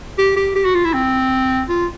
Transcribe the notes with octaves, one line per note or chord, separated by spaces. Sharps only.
G4
G4
G4
F#4
F4
E4
C4
F4